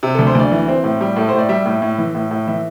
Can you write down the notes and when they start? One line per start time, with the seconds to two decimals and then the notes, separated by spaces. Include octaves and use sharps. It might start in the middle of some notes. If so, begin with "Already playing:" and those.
0.03 C3
0.15 D2 A4
0.27 C5
0.35 D2 D5
0.51 E3
0.68 C4
0.84 A2
1.01 G3
1.16 A2 A4
1.28 A2 C5
1.38 D5
1.49 G3 E5
1.66 A2
1.82 A2
1.98 E3
2.15 A2
2.31 A2
2.47 E3 E5